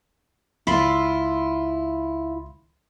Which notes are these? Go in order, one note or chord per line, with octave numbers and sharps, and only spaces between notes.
C#2 E4 F4 B5 C6